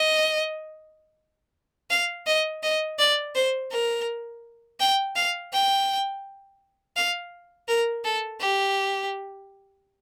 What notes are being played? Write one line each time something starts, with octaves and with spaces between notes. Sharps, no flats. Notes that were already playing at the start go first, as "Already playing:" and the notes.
Already playing: D#5
F5
D#5
D#5
D5
C5
A#4
G5
F5
G5
F5
A#4
A4
G4